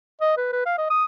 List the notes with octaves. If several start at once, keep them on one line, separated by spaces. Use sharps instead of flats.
D#5
B4
B4
F5
D#5
D#6